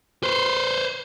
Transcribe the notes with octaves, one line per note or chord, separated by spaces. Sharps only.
B4 C5